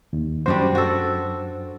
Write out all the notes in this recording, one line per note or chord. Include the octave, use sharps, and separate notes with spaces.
D#2
F#2 G3 D4 F#4 C5
F#4 A4